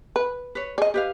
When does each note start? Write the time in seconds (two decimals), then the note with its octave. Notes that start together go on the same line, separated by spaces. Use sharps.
0.16 B4
0.55 B4 C#5
0.78 G#4 D5 D#5
0.94 G4 B4 F5